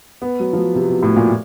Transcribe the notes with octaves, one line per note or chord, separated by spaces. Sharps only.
B3
F#3
F3
F#3
C3
B2
A2
A#2